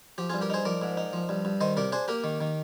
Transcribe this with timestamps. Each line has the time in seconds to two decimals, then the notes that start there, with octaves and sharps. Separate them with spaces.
0.18 F3 G4
0.29 F4 G#4
0.34 G2
0.41 G4 A#4
0.50 D#4 G#4 C5
0.65 F3 A#4 D5
0.82 G#2
0.97 D#4
1.13 F3
1.29 G2
1.45 G2
1.61 D#3 C5 D#5
1.77 C3 A#4 D5
1.92 D4 G#4 C5
2.08 A#3 G4 A#4
2.24 D#3
2.41 D#3